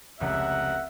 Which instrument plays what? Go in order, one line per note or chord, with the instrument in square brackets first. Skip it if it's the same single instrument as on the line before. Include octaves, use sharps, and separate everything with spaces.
[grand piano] F1 C#2 [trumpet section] A#4 F#5 [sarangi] E5